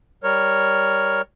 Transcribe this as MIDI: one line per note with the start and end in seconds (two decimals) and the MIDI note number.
0.24 1.22 55
0.24 1.22 70
0.24 1.22 73